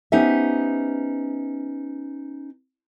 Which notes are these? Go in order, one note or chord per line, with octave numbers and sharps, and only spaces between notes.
B3 C#4 D#4 G4 C5 E5